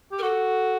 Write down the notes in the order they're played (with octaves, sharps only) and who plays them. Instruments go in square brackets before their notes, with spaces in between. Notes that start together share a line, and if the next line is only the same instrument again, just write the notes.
[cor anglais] G4
[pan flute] A#4
[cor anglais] F#4 [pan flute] A4